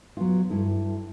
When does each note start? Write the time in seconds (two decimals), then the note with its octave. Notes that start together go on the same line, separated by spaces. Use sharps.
0.17 F#3 B3 F4
0.50 G2 E4 A4